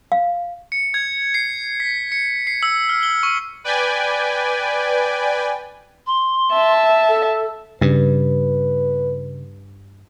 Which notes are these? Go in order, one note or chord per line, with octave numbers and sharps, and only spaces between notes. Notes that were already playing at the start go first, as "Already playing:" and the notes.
F5
C#7
G#6
C7
B6
C#7
C7
E6
F6
G7
C#6
B4 D5 G5 G#5
C6
E5 A5
A4
G2 C#3 B4